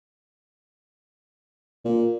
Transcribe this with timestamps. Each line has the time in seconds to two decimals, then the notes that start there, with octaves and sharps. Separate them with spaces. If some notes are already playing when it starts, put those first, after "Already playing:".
1.84 A#2